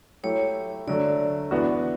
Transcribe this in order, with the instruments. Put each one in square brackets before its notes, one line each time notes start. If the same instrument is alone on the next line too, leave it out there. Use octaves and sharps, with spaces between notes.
[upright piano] F#3 A3 E4 G4 [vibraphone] C#5
[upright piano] D3 F#3 A3 [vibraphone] D5
[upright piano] E3 B3 D4 F#4